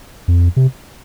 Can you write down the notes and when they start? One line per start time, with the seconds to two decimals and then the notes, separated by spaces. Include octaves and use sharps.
0.28 F2
0.56 C3